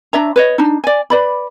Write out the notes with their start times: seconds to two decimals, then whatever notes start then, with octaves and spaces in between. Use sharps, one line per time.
0.13 D4 C#5 E5 A#5
0.36 B4 C#5 D#5
0.58 D4 D#4
0.84 D5 G#5
1.10 B4 D5 B5